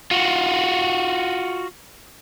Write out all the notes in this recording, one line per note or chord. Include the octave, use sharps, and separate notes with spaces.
F4 F#4